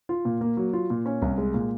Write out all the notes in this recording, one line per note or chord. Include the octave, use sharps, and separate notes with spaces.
F4
A#2
A#3
F#3
F4
A#2
C#4
C2
G#3
A#2